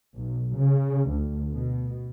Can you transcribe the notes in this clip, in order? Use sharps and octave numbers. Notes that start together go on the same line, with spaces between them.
B1
C#3
D2
B2